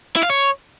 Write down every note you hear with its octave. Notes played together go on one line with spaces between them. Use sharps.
E4
F5
C#5